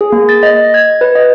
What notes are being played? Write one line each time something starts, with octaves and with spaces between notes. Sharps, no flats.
G#4
A#3
A6
D#5
G#6
B4
D#5